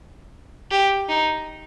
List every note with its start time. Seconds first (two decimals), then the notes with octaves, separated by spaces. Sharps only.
0.71 G4
1.09 D#4